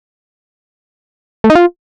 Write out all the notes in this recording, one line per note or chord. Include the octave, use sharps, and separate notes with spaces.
A3
D#4
F4